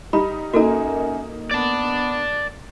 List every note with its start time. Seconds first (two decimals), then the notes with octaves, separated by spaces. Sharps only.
0.13 G3 D#4 B5
0.53 F#2 A#3 D#4 F#4 A4 A#5
1.51 B3 D5 A5